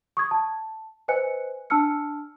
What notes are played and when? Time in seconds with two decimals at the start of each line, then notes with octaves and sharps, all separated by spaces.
0.17 C#6 D#6 G#6
0.31 A5
1.08 B4 C5 D#5 G#5 F#6 C#7
1.70 D4 A5 E6 F6 C#7